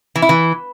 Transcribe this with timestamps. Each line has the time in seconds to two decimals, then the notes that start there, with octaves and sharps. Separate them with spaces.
0.15 E3
0.22 E4
0.29 E3